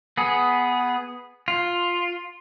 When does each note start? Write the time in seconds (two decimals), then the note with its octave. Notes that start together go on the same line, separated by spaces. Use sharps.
0.18 B3 G#4
1.48 F4